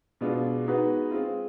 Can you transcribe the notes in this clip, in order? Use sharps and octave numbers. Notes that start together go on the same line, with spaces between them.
B2 G#3 B3 D4 F4
G#3 B3 D#4 F#4 B4
G#3 C4 F4